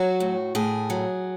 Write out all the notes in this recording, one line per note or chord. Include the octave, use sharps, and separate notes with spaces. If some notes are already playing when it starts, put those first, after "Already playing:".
Already playing: F#3 F#4
A2
A2 G#4
F#3